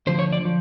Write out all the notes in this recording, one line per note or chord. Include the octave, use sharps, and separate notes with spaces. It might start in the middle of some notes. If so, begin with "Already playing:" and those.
D2 D3 F3 C5
C#5
D5
F3